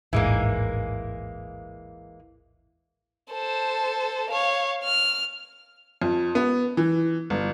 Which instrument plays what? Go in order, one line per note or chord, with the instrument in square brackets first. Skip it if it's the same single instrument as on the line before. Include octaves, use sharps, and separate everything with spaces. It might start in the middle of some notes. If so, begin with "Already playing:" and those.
[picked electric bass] D#1 A1 G#2 [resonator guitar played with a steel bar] E3 G#3 A#3
[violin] A4 C5
C#5 F5
F6
[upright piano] F2
B3
E3
G1